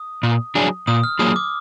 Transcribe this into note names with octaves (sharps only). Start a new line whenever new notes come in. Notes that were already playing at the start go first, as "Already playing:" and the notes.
Already playing: D#6
A#2
F#3 D4 G#4
A#2 D#6
F6
F#3 A#3 F4 G#4 D#6
D6